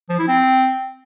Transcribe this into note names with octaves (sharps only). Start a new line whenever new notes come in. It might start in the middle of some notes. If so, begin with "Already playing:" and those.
F3
E4
C4